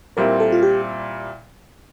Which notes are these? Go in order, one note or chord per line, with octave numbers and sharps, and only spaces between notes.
A#2 G3 C4 E4 A#4
A4
F4
G4